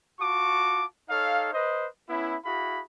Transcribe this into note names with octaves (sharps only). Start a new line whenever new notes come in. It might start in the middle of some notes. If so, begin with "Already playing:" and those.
F4 F#4 A5 C#6 D6
D#4 A4 C#5 F5
B4 C5 D#5
B3 C#4 E4
E4 F#4 G#4 F5 B5